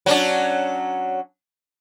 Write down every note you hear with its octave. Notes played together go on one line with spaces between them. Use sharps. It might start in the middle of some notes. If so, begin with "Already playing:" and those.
F#3 C#4 D4